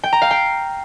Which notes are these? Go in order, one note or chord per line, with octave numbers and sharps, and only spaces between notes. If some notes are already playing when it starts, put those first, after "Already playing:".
G5
A#5
F5
G5